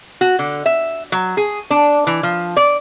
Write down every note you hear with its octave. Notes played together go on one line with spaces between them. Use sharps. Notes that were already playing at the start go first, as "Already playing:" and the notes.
F#4
D3
E5
F#3
G#4
D4
E3
F3
D5